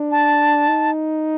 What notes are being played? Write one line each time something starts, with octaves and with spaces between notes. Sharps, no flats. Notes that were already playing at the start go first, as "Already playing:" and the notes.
Already playing: D4
A5
D#4